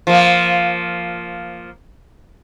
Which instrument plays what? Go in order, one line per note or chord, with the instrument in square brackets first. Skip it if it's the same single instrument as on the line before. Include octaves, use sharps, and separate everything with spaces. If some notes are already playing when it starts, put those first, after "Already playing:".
[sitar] F3 A#3